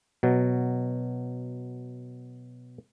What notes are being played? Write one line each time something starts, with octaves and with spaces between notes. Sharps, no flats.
B2 F#3